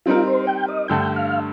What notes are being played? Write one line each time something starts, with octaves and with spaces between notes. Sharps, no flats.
G3 C4 D#4 F4 A#4
C5
G5
D#5
G2 D3 A3 G5
F5